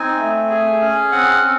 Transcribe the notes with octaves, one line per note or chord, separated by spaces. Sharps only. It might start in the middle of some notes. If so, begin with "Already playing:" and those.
Already playing: C4 D#4 G#5
A3
G#4
C#4
C4 F#5
C4